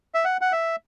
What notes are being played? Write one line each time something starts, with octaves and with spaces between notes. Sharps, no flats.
E5
F#5
F#5
E5